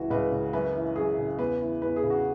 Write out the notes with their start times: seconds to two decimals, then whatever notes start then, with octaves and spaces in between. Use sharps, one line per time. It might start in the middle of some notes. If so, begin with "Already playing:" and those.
Already playing: C#2 E3 F#4
0.10 C#2 B4
0.32 C#3
0.53 F#2 B4
0.75 E3
0.96 F#2 G#4
1.18 C#3
1.39 E2 B4
1.61 E3
1.82 E2 B4
1.96 G#4
2.03 C#3
2.10 F#4